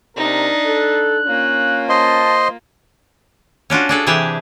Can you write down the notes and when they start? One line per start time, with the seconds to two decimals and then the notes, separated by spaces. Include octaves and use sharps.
0.17 C3 D4 D#4 A#4
0.65 A4 F#6
1.27 A#3 C#4 F4
1.89 C5 D#5 A5 C6
3.70 C#4 D4 F4 F#4
3.89 D4 G#4 A4
4.06 C3 E3 G4 G#4 E5 A5